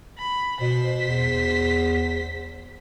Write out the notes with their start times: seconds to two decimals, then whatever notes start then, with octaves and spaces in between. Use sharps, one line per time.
0.18 B5
0.61 B2 C5 B6
1.09 E2